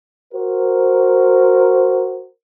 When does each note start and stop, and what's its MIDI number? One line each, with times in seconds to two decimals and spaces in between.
0.33 2.27 66
0.33 2.27 70
0.33 2.27 72